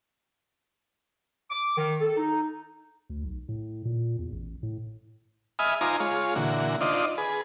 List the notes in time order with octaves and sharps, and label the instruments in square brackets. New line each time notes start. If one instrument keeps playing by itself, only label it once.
[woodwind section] D6
D#3
A4
D#4
[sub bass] D2
B1
A2
A#2
E2
A1
A2
[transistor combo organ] D#5 E5 G#5 B5 D#6 F6
D#4 F4 C5 G#5 A#5 D6
G#3 F4 C#5
A#2 D3 E3 F#4
D4 D#4 F4 C5 D5 D#5
G#4 B4